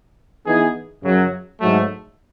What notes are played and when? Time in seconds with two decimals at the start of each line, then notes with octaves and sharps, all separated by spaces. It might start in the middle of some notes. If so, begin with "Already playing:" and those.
0.46 E3 B3 D#4 G#4
1.02 F#2 C#3 F#3
1.59 G#2 F#3 A3